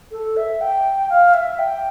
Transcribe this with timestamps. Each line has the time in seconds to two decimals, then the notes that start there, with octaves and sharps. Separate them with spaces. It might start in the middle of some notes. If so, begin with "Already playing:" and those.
0.12 A4
0.37 E5
0.61 G5
1.10 F5
1.34 E5
1.59 G5